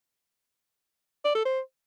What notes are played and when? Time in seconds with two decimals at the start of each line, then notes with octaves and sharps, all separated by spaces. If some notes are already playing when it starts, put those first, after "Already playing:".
1.25 D5
1.35 A4
1.45 C5